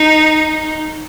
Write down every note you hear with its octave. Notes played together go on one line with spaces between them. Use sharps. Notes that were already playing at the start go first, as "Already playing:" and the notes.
Already playing: D#4